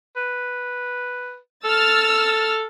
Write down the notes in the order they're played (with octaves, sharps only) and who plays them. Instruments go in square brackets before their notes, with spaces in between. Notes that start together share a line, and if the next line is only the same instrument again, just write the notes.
[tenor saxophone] B4
[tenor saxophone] A4 [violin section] E6 F6 A6